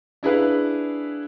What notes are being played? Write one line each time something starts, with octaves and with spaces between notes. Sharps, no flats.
D4 E4 G#4 B4 F5